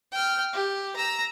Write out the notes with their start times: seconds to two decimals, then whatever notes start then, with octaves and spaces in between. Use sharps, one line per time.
0.12 G5 F6
0.53 G4
0.96 A#5 E6